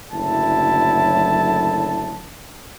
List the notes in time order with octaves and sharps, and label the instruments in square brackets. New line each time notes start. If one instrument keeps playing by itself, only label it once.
[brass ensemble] F#1 A2 D3 F#3 E4 A5